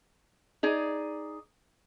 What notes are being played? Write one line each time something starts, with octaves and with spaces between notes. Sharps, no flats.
D#4 G#4 D5